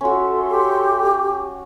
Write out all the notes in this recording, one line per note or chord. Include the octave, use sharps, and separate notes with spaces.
C#4 F#4 A4 E5 C6
G4